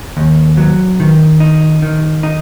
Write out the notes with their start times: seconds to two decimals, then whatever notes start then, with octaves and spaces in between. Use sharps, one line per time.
0.17 D#2
0.57 F#3
1.00 D#3
1.40 D#4
1.82 D#3
2.23 D#4